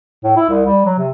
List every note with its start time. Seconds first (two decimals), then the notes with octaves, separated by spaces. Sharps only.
0.24 A2
0.36 E4
0.50 C2
0.66 G3
0.86 F#3
0.99 C3